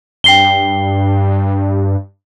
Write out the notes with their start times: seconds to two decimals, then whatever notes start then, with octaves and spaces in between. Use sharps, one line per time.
0.24 G2 G5 C7 G7